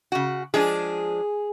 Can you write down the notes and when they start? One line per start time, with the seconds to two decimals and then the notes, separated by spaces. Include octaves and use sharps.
0.12 C#3 F#4
0.54 F3 G#3 D4 G#4